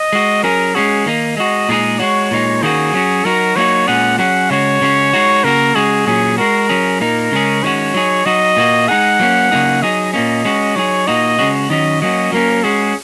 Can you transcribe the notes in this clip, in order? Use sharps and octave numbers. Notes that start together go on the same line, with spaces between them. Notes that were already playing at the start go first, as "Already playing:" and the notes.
Already playing: D#5
G#3 F#4
F#3 C#4 G#4 A#4
G#3 C#4 F#4 G#4
D#3 A#3 D#4
G#3 F#4 D#5
A#2 G#3 D#4 G#4
G#3 F#4 C#5
A#2 G#3 D#4
D#3 A#3 C#4 F#4 G#4
F#3 C#4 F#4
F#3 D#4 F#4 A#4
F#3 A#3 D#4 F#4 C#5
A#2 G#3 C#4 G#4 F#5
F#3 C#4 G#4 F#5
C#3 G#3 F#4 C#5
C#3 G#3 C#4 F#4
G#3 D#4 F#4
C#3 A#3 F#4 A#4
C#3 G#3 F#4 G#4
A#2 F#3 C#4 G#4
G#3 F#4 A#4
F#3 C#4 G#4
A#2 A#3 D#4 A#4
C#3 G#3 C#4 G#4
D#3 G#3 C#4 F#4 C#5
F#3 D#4 G#4
F#3 D#4 F#4 D#5
A#2 A#3 F#4
G#3 D#4 G#4 F#5
F#3 A#3 C#4
C#3 F#3 A#3 D#4 G#4
F#3 D#4 G#4 D#5
A#2 A#3 C#4 D#5
G#3 C#4 F#4
F#3 D#4 G#4 C#5
A#2 A#3 D#4 F#4 D#5
C#3 G#3 C#4 F#4
D#3 F#3 C#4 F#4 D#5
F#3 A#3 C#4 F#4 D#5
F#3 A#3 C#4 A#4
G#3 C#4 F#4 G#4